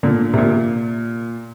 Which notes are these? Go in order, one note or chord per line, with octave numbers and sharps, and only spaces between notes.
A#2 D3
C3
A#2